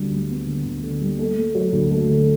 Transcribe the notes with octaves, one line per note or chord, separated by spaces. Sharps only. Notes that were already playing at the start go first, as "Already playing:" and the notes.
Already playing: D2 G3
G3
B3
D3
D2
D3
G3
A3
A3
F#3
D2
A3
D3